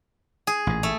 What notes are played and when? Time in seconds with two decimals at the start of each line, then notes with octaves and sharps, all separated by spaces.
0.47 G#4
0.67 A1 A#2
0.83 A3